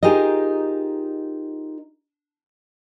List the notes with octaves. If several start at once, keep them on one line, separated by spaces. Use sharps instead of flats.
D#4 F4 G4 G#4 A#4 D#5